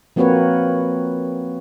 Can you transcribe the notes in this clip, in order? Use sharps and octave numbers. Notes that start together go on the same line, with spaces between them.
F3 A#3 C4 F#4 B4 C#5